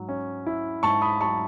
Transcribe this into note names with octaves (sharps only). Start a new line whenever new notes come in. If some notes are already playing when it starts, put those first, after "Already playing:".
Already playing: G#2 F#3
C#4
E4
G#2 A5 C#6
B5 D#6
F#3 A5 C#6